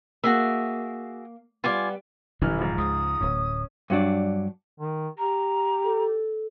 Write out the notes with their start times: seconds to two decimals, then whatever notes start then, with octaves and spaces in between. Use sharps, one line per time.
0.24 A#3 F#4 G#4 E5
1.64 G3 B3 F4 G#5 D6
2.41 D#1 A1 D3 E3 F#3 F6
2.59 G#2 F3
2.78 C#2 C#3 D#6
3.21 D1 A2 C#4
3.90 G2 F#3 D4
4.80 D#3
5.18 G4 A#5
5.84 A4